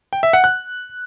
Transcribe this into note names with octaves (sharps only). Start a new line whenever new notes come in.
G5
E5
F#5
F#6